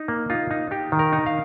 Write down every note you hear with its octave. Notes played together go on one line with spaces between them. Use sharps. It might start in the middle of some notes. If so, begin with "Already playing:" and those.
Already playing: D#4
A#3
D#4 F4
D#4
D#4 G4
D#3
A#4
D#4
F5